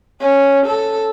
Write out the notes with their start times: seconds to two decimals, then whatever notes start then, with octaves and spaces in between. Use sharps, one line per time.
0.21 C#4
0.66 A4